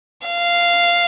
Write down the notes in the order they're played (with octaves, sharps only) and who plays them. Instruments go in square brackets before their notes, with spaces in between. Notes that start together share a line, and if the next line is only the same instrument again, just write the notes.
[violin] F5